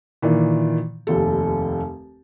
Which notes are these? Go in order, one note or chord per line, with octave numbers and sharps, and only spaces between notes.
A#2 D#3 E3
F1 D#2 A4